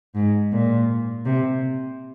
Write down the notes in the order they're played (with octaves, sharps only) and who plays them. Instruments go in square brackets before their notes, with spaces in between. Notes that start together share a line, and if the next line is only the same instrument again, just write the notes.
[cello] G#2
A#2
C3